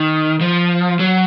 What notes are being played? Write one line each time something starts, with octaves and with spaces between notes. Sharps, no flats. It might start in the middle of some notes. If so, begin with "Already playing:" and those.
Already playing: D#3
F3
F#3